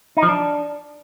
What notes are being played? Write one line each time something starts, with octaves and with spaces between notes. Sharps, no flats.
D#4
F3
D4